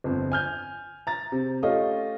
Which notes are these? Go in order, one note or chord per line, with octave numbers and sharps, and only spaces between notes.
G1 F2
G#5 F6 G6
A#5 A6
C3
A3 C#4 F4 G4 D#5